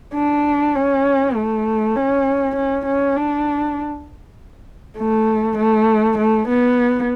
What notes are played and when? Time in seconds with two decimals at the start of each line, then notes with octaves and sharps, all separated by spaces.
0.14 D4
0.75 C#4
1.35 A3
1.96 C#4
2.56 C#4
2.86 C#4
3.16 D4
4.97 A3
5.58 A3
6.18 A3
6.48 B3